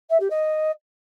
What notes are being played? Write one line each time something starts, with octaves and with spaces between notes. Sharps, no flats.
E5
G4
D#5